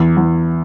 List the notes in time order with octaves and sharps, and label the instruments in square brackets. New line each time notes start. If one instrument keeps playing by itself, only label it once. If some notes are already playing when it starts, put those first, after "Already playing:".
Already playing: [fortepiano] E2
E2